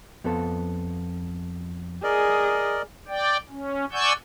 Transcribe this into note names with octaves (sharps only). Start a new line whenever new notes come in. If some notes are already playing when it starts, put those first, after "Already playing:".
F2 B3 A4
G#4 A#4 D5 D#5
D5 G5
C#4
D5 F#5 G#5 C#6 E6 G6